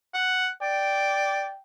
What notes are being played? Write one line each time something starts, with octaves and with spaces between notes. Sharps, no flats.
F#5
D5 G5